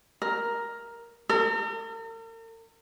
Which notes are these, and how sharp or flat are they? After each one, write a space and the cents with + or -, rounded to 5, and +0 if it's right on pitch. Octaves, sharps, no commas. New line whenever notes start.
A#4 +5
A#4 -45